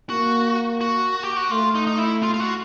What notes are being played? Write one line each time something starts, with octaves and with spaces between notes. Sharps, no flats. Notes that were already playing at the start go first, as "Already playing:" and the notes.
A#3 F#4
F#4
G4
F#4
A3 F4
D#4
D#4
E4
F4
F4
F#4